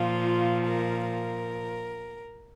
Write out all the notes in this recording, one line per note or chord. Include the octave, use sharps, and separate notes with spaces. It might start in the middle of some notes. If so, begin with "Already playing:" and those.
Already playing: A#2 F3 F4
A#4
A#4